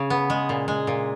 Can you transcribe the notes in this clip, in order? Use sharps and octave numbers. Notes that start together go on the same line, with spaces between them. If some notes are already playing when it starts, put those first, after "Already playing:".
Already playing: C#3 G#4
B3
G#3
A#2
G#3
A#2